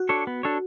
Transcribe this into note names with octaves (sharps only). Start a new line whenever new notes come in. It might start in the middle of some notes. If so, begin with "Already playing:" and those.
Already playing: F#4
D4 A4 C#5
B3
D4 A4 C#5